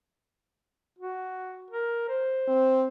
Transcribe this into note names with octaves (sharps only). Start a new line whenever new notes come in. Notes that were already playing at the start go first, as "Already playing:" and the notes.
F#4
A#4
C5
C4